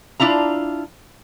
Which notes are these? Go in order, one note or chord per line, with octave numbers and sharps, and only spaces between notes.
D4 E4 F4 A#5